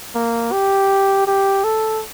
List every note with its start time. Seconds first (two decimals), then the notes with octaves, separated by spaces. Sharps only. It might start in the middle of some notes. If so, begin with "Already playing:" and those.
0.15 A#3
0.52 G4
1.27 G4
1.64 A4